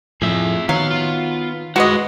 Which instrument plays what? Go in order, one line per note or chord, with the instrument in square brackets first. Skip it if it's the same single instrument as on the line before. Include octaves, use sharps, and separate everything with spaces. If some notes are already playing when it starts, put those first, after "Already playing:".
[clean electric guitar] F2 F3 [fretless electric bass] A2 [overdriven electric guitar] G#4 E5
[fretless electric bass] D#3 [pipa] F#3 [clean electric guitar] B3 [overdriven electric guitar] F5
[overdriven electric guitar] F4
[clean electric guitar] G#3 [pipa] F#4 B4 D#5 [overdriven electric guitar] C5 F#5